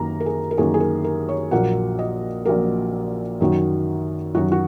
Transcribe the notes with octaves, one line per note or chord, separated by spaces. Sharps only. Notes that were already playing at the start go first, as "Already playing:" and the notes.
Already playing: F#2 D#3 A#3 A#5
A#4
G#4
A#4
F#2 D#3 A#3 G#4
G#4
A#4
A#4
C#5
A#1 A#2 F#3 A#3 F#5
D#5
A#1 A#2 F#3 A#3 A#4
F#2 D#3 F#3
F#2 D#3 F#3 F#4
F#4